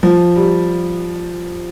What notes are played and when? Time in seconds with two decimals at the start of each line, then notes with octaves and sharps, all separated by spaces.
0.03 F3
0.36 G3